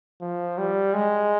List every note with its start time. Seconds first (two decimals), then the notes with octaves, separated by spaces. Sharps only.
0.21 F3
0.58 G3
0.94 G#3